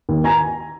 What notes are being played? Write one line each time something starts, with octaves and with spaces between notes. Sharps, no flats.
D#2
G#5 A#5